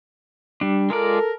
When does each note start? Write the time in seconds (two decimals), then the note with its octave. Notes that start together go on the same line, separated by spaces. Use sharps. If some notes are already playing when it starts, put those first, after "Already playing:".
0.61 G3 D4
0.90 G#3 F4 A4 A#4 D5